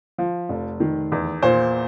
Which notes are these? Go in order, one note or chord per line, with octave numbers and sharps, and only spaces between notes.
F3
F1
D#3
E2
A#2 C5